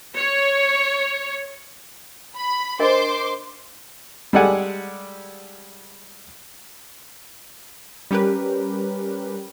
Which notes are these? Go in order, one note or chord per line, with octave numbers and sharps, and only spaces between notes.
C#5
B5
D4 A#4 C5 D#5 C6 D6
G3 G#3 A4 D5 F#5 G#5
G3 C#4 G4 A#4 B4